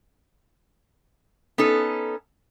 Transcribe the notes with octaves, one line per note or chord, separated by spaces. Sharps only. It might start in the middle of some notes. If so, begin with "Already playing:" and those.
B3 C#4 D#4 A4